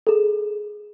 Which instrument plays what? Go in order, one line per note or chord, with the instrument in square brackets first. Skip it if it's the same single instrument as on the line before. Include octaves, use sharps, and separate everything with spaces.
[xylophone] G#4 A4